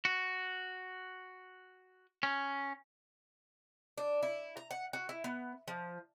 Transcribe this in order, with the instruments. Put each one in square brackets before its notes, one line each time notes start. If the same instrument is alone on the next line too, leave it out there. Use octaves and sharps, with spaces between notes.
[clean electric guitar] F#4
C#4
[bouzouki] D4
E4
A#5
F#5
F#4
E4
B3
F3